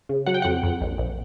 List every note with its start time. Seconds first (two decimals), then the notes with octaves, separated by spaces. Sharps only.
0.09 C#3
0.26 F#3 F#5
0.34 G5
0.42 F2 F#5
0.63 F2
0.81 A#1
0.98 A#1